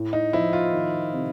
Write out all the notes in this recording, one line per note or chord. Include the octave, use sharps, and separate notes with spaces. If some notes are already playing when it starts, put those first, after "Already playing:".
Already playing: A2
D#4
F3 E4
F4
D#3
C3